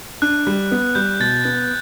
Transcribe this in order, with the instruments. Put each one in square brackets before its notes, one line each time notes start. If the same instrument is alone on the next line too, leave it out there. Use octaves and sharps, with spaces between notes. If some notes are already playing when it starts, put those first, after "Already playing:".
[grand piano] D4 [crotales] F#6
[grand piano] G3
B3
[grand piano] G3 [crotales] G6
[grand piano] B2 [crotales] A6
[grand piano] B3 [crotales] A6